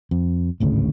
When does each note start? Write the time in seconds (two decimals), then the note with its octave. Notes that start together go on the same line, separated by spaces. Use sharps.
0.11 F2
0.60 G#1 D2 A2 C#3